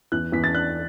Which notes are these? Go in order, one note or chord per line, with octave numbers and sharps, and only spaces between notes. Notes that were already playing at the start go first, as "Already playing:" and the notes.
E2 F#6
E2 B6
A6
D4 F#6